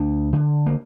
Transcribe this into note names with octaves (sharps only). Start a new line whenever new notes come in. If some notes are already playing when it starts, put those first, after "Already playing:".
Already playing: D2 D4
D3
A#3